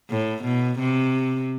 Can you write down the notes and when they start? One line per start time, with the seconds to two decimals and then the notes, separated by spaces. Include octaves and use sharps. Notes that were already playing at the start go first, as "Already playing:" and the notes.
0.10 A2
0.44 B2
0.80 C3